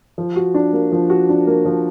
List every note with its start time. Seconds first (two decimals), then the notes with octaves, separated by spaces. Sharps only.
0.18 F3
0.36 F#4
0.54 D4
0.73 A#3
0.92 F3
1.10 F#4
1.29 D4
1.47 A#3
1.65 F3